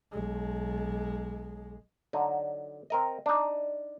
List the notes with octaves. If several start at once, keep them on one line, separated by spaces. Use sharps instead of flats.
B1 G#3
D3 F#3 D#4
C4 A#4 D#5
D4 D#4